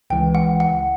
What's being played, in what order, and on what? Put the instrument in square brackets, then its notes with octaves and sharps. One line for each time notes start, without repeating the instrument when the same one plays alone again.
[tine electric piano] C#2 C#3 E3 G#3 [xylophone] G5
[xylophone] F#5
F#5